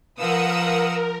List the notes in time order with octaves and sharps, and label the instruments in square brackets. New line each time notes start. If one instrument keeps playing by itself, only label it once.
[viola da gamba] F3 [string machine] A#4 [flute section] B4 D#5 F5 [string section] F#5 D#6 E6